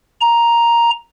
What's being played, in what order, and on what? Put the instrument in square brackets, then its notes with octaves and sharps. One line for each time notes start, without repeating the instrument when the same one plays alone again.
[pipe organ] A#5